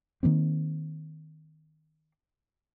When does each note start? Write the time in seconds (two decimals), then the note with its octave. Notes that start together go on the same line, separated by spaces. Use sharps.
0.23 D#3 F3 A#3 C4